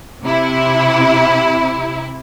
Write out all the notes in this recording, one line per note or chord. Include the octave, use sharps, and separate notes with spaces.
C3 E4